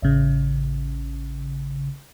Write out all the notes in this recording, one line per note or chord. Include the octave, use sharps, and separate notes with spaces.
A1 C#3